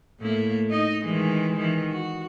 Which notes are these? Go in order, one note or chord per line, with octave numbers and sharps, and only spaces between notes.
A2 A#3 E4
D#4 D#5
D#3 E3 G#3
D#3 E3
F#4